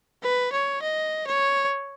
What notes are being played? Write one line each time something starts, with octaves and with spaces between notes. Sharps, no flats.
B4
C#5
D#5
C#5